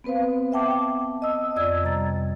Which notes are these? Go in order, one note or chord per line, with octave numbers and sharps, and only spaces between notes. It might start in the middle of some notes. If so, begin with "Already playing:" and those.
B3 C4 B4 C5 F5
E5 F#5 G5 A5 D6
D#5 A5 D#6 E6
F2 D5 E6 G#6
C3 G3 A#5 A6